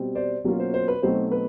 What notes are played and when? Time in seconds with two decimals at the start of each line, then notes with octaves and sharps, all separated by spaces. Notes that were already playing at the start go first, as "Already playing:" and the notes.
Already playing: B2 G3 C4
0.15 C5 D5
0.44 B2 F#3 A#3 C#4 F4
0.60 C5
0.74 C5
0.88 B4
1.02 B2 F#3 A3 C4 D#4 C5
1.32 B4